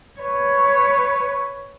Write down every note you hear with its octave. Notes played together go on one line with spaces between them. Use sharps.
B4 C#5